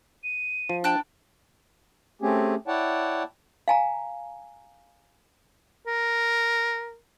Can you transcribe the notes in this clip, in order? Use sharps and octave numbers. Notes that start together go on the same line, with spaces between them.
D#7
F3
D4 G5 A5 F#6
A3 C4 C#4 G4 G#4
E4 C#5 D5 F#5 G5 A5
F5 G#5 A#5
A#4